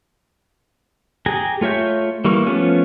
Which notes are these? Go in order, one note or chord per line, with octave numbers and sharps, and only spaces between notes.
G4 G#4 G#5 A#5
A3 F4 C#5 E5 G6
E3 G3 A#3 C#6
F3 A3 B3 C#4 F4